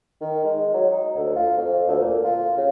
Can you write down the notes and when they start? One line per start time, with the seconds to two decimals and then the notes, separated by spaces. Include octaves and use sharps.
0.21 D#3
0.44 G#3
0.74 F#3
0.90 D#4
1.16 D2
1.36 F4
1.58 F2
1.88 D2
2.01 A#2
2.24 F4
2.57 C#3